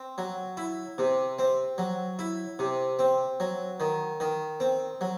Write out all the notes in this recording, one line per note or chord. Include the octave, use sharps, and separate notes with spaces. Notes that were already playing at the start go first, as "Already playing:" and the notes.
Already playing: C4
F#3
E4
C3
C4
F#3
E4
C3
C4
F#3
D#3
D#3
C4
F#3